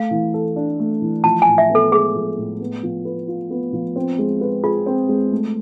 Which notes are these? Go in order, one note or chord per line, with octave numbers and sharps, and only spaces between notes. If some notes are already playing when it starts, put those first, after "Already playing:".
Already playing: A3 F5
E3
A4
D4
A3
E3
F3 A5
A2 G#5
E5
B3
A4
G#3 G#4
F3
A2
B3
F3
B4
F4
B3
F3
C4
G#3
B4
F4 G#4
C4
G#3
A3